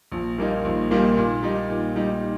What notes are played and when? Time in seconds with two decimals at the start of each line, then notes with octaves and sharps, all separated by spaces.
0.12 A#1
0.38 A#2 G3 A#3 D#4
0.64 A#1
0.91 A#2 G3 A#3 D#4
1.17 A#2
1.43 G3 D#4
1.70 A#2
1.96 G3 D#4